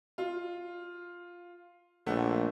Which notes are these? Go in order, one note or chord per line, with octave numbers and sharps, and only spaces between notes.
F4
A#1 A3 F#5